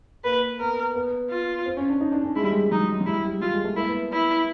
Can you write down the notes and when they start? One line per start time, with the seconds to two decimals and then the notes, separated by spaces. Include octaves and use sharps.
0.24 A#3 B4
0.60 B3 A#4
0.95 B3
1.30 F4
1.66 C4
1.77 C#4
1.89 D4
2.01 D#4
2.12 D4
2.24 C#4
2.36 G#3 E4
2.43 G3
2.52 G#3
2.71 F#3 D#4
3.01 F#3
3.06 G3 E4
3.25 G3
3.42 G3 F4
3.54 G#3
3.65 A3
3.77 A#3 E4
3.89 B3
4.13 E4